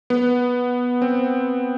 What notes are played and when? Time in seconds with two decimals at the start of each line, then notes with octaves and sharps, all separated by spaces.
0.10 B3
1.02 C4